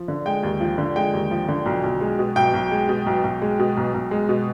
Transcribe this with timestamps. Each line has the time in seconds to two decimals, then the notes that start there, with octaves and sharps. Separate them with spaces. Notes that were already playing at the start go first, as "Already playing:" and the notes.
Already playing: F3
0.08 D3
0.26 G#3 G5
0.43 D#2
0.60 F3
0.78 D3
0.96 G#3 G5
1.13 D#2
1.31 F3
1.48 D3
1.66 B1
1.84 B1
2.01 G#3
2.19 B2
2.36 B1 G5
2.54 B1
2.71 G#3
2.89 B2
3.06 B1
3.24 B1
3.42 G#3
3.59 B2
3.77 B1
3.94 B1
4.11 G#3
4.29 B2